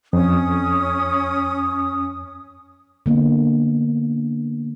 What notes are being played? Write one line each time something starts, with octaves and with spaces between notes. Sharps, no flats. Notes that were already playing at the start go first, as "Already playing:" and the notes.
F2 C#4 D#6
D3 A#3 B3